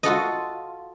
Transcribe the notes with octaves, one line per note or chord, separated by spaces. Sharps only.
F4 F#4 A4 D#5